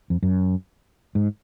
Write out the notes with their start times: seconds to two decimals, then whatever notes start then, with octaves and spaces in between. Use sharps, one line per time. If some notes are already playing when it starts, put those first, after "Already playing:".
0.10 F2
0.22 F#2
1.15 G#2